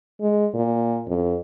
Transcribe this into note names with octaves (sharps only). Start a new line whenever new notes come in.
G#3
A#2
F2